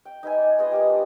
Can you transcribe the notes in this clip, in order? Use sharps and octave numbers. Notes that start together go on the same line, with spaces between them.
G5
D#4 B4 E5 G#5
D5
B3 F4 G#4 D#5
G3 A#3 B3
D4